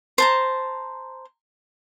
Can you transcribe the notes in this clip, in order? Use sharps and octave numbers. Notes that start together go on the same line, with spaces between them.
C5 A5 A#5